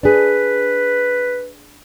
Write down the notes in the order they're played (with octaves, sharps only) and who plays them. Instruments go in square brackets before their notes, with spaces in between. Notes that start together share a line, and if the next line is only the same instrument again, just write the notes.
[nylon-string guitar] D4 G#4 [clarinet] B4